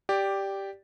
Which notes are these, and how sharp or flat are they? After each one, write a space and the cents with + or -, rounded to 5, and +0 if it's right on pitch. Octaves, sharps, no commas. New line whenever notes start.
G4 +0 D5 -5